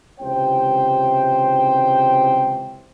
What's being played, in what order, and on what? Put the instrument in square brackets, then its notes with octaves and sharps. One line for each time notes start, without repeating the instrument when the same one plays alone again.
[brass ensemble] C#2 C3 E3 C5 G5